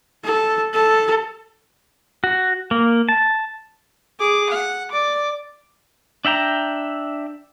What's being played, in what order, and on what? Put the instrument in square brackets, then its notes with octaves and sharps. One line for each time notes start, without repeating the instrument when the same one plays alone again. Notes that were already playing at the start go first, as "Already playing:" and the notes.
[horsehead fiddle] A4
A4
[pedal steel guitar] F#4
A#3
A5
[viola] G#4 D6
F#5
D5 D6
[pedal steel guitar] D4 E5 G5 A#5